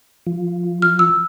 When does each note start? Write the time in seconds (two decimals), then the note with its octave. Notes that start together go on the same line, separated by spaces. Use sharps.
0.27 F3
0.82 F6
0.99 E6